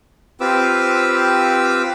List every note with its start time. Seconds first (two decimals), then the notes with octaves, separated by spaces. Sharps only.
0.41 C4 F4 G4 B4 D6 E6